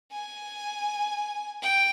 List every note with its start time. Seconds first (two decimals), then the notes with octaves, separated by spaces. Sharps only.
0.12 G#5
1.62 G5